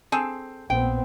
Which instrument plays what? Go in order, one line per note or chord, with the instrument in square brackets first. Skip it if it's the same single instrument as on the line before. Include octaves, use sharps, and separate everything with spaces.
[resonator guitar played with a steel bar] C4 [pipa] G#4 A4
[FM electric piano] A#1 A#2 [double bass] B3 C4 [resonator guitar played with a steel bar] G5